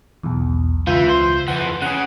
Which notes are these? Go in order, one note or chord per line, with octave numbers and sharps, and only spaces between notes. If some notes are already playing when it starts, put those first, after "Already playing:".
B1 E2
C#2 E3 E4 F4 G6
C5
F2 E3 F#5
C#3 G#4 F#5